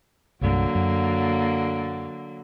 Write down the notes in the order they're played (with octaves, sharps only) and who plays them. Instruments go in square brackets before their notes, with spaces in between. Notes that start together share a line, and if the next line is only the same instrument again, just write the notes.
[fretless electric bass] C2 G2 [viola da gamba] D3 F#3 A#3
[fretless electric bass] F#2